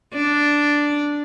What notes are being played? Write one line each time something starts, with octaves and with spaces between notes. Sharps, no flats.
D4